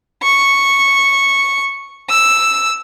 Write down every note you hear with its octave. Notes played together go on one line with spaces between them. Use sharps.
C#6
E6